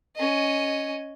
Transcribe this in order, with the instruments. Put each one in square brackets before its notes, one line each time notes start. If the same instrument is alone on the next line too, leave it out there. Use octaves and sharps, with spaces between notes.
[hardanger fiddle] C#4 D#5